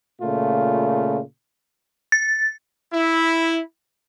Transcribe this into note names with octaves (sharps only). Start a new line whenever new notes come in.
A#2 C#3 A3 F4
A6
E4